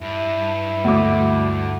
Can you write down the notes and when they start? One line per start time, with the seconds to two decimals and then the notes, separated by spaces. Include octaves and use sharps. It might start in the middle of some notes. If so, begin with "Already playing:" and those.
0.01 G2 E4
0.84 D2 D6